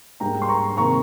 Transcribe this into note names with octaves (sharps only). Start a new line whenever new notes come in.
G#2 G3 A#3 G5 A#5
C6
A#5 C#6
C3 D#3 A#3 A#5 C#6